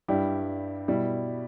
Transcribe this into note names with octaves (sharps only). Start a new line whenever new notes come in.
G2 G3 E4 G4
B2 G3 E4